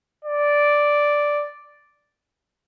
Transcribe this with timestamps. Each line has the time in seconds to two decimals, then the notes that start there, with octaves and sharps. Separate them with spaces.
0.25 D5